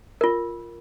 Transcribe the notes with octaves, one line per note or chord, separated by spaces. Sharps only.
F4 A#4